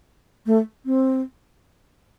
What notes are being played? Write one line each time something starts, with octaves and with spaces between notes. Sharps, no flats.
A3
C4